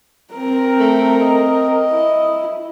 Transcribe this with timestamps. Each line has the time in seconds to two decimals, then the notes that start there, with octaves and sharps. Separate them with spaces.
0.34 C4 A#4
0.80 A3
1.21 D#5
1.91 E4